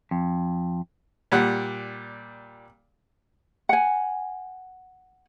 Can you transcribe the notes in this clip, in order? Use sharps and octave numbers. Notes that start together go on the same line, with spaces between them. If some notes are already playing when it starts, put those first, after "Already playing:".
F2
A#2 G3 F#5
F#5 G#5